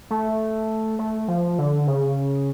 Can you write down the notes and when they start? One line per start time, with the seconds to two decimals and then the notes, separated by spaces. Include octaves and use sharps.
0.10 A3
0.99 A3
1.28 F3
1.59 D3
1.87 C#3